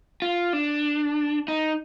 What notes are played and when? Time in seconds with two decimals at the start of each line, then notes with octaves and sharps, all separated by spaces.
0.22 F4
0.53 D4
1.48 D#4